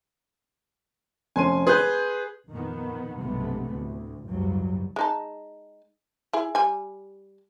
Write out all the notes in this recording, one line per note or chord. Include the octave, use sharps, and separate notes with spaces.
F1 C#4 G#5 C6 D#7
G#4 B4 C6 F#6 G6
F2 A#2 D#3 B3
B1 G2 C3 G#3 A3 B3
D2 A2
F#1 C#2 G#2 F#3 G3
G#3 D#4 A5
E4 G#4
G3 G#5